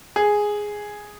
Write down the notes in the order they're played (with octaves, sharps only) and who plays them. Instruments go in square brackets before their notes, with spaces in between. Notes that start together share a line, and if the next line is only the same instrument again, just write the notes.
[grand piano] G#4